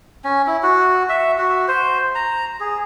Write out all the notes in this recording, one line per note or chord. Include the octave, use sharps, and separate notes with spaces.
C#4
E4
F#4
E5
F#4
C5
A#5
G#4